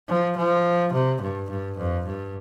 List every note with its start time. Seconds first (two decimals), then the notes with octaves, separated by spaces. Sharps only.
0.08 F3
0.37 F3
0.93 C3
1.22 G2
1.50 G2
1.78 F2
2.07 G2